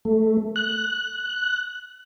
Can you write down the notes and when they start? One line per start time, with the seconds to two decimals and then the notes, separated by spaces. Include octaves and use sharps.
0.05 A3
0.56 F#6